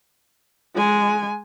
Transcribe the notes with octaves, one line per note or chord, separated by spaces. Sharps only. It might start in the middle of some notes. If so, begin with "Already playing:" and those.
G#3 G#5